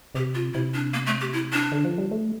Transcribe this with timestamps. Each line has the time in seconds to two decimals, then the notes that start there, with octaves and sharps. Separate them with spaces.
0.15 C3 G4
0.35 F4
0.54 C3 E4
0.74 D4
0.94 A#3
1.06 A3
1.20 G4
1.33 E4
1.53 D4
1.72 D3
1.85 F3
1.98 G3
2.11 A3